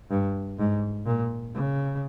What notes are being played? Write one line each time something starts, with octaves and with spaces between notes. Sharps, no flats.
G2
G#2
A#2
C#3